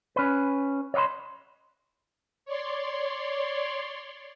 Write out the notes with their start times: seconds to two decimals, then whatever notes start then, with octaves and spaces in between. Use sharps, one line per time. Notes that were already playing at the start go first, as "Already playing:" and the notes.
0.16 C#4 B4
0.94 C#5 D#5 F5 B5 C6
2.45 C#5 D5 C6